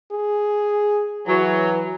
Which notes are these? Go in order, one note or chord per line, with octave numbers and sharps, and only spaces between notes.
G#4
E3 F#3